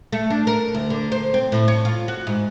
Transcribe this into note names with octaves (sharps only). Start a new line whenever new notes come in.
A3
D4
A#4
D2
D3
C5
C4
A2
C#5
F4
F#4
G#2